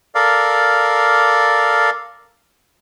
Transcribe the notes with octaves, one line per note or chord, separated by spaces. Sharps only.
A4 A#4 D5 F5